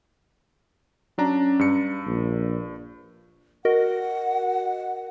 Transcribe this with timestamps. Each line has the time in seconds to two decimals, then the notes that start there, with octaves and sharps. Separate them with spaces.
1.18 F#3 C#4 D4 A#5
1.59 G2 C#7
2.07 A#1
3.65 F#4 A#4 D#5 F#5